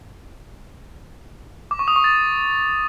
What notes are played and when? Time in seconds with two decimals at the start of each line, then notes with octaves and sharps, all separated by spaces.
1.71 D6
1.79 C#6
1.88 D#6
1.96 C#6
2.04 A6